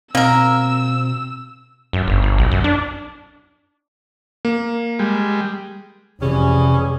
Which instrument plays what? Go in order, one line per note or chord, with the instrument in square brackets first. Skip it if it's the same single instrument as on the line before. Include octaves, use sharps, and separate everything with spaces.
[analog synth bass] B2 [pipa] A#3 A#4 [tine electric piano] C4 [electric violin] E6
[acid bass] F#2
G1
G1
B1
F#2
D4
[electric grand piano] A#3
[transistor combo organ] G3 G#3
[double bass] F1 [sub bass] C3 [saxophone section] E3 G3 C#4 [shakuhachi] G#4